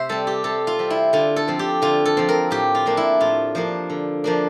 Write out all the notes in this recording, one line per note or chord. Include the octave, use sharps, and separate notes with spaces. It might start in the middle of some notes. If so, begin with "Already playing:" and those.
Already playing: C3 C5 E5
G3 C4 A4
G4
C3 A4
F4
G3 C4
E4
D3 F4
A4
F3 C4
G4
D3 F4
A4
F3 C4
A#4
A2 G4
F4
F3 A#3 D4
E4
A2 F4
F3 A#3 D4
D3
F3 A#3 D4